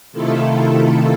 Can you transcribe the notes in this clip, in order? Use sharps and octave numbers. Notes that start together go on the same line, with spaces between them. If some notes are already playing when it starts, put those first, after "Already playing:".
C3 D#3 A3 E4 F4 A4